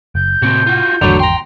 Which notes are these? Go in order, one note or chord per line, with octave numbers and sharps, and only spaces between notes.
F#1 G6
A2 C3 A#3 C4 F#4
F4 F#4
G#1 E2 D3 F#3 A3
G5 A#5 C6